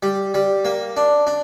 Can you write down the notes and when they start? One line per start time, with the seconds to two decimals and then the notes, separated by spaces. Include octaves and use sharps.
0.03 G3
0.34 G3
0.65 A#3
0.97 D4
1.27 D4